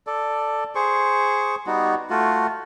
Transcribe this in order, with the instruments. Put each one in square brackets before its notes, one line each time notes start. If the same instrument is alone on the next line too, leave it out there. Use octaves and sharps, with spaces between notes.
[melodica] A4 D5
G#4 C5 C#6
G3 B3 D#4 F#4
A3 F4 F#4